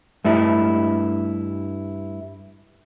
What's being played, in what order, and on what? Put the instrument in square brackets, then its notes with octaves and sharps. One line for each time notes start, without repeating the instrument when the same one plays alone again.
[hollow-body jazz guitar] G2 A3 D#4 E4